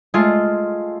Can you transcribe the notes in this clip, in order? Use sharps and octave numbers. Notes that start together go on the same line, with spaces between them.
G#3 A3 F4